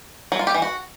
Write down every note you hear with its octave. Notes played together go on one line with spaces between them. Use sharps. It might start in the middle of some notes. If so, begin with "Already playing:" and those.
F#3
F4
G4
E3
F#4